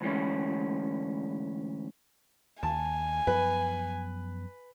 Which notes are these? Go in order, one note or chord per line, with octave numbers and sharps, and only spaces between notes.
D2 G#2 E3 G#3 C#4
D#2 G#5 A5
F#2 F3 B3 B4